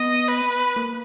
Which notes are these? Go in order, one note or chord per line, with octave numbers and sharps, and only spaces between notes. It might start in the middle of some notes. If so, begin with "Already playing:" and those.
Already playing: B3 D#5
B4
A#3